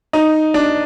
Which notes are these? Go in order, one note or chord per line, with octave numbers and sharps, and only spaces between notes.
D#4
D4